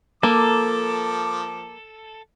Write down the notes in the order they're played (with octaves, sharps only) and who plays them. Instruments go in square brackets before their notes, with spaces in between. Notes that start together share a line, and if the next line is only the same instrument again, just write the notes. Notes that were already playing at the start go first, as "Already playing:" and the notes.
[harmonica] F3 D6 [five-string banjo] A#3 [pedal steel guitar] A4